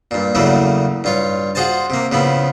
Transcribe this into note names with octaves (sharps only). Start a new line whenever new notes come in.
G2 A#2
E2 C#3 E3 F#3 A3 A#3
G2 F4 C#5
F4 F#4 G#4 C5 G#5 A5
C3 A#3
C#3 F3 B3 E4